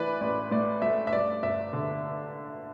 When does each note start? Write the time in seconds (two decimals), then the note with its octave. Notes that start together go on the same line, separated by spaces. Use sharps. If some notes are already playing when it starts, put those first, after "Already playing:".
Already playing: E3 A3 B4 D5
0.21 A1 D5
0.51 A2 D5
0.82 A3 E5
1.07 E5
1.13 G2 D5
1.43 G1 E5
1.73 D3